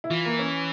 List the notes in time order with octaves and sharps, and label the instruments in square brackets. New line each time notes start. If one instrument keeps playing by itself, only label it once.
[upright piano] E4
[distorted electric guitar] E3 [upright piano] F4
[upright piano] A#3
C#4